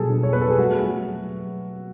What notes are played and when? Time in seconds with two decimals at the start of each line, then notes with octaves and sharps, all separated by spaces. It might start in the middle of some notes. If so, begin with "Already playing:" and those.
Already playing: B2 F#3 B3 G#4 A4
0.10 D4
0.23 C#5
0.33 B3 B4
0.41 A4
0.50 G#4
0.58 A3 F#4
0.83 F#3